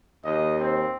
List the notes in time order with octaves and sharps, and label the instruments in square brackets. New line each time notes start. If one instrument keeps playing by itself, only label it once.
[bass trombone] D#2 [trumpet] D#5
[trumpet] C4